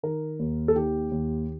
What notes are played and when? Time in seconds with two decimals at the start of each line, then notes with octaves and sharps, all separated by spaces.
0.03 D#3 A#4
0.40 D#2
0.68 A4
0.75 D#3 G4
1.11 D#2